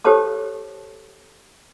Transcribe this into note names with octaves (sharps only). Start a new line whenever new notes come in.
G4 A4 C5 C#5 A5 D6